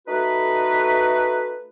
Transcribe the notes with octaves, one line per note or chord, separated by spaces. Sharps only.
A3 D#4 F#4 A4 B4